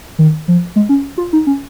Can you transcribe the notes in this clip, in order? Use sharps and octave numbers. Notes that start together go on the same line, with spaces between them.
D#3
F3
G#3
C#4
F4
D#4
C#4